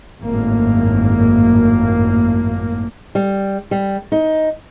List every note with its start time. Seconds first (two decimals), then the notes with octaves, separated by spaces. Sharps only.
0.21 G#1 F#2 A2 A#3
3.15 G3
3.71 G3
4.12 D#4